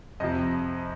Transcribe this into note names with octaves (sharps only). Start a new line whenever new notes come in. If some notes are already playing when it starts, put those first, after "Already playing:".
F2 C3 F3 D#5